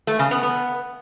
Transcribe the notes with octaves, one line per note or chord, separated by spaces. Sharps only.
A3
C#3
B3
B3